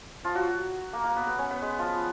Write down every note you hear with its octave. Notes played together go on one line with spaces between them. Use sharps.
F3 F4
F#3 F#4
A#3 A#4
A#3 A#4
B3 B4
B3 B4
C#4 C#5
B3 B4
G#3 G#4
F3 F4